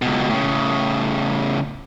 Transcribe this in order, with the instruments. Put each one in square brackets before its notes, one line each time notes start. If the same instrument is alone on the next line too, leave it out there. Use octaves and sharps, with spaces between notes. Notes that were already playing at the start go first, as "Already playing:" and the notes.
[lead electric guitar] C#2 B2
A2 C#3